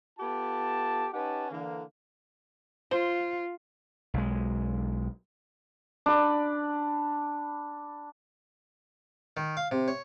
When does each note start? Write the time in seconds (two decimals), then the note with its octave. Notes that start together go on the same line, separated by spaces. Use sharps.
0.19 B3 F4 G4 A4 A5
1.14 C#4 D#4 G4 B4 F#5 A5
1.51 D3 E3 A#3
2.91 F4 C5
4.14 B1 G#3
6.06 D4 B5
9.37 D#3
9.57 F5
9.71 C3
9.88 C#5